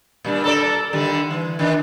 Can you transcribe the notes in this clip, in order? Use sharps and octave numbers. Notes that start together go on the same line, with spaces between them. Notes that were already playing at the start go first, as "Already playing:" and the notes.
A#2 G3 D4
A4 A#4 D5
D3 D#3 G3
E3
D#3 D4 F4